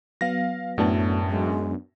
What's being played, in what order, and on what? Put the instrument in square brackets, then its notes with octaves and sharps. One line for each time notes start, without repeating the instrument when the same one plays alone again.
[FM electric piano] F#3 B3 [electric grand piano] F5 A#6
[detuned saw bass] F#2 [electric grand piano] A2 A5 [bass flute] A3 [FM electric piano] B3 D4 F#4
[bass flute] G#3